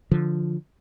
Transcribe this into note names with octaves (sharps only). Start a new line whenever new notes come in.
D3 F3